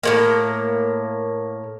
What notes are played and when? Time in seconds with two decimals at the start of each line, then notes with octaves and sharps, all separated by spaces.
0.03 A2 G#3 A#3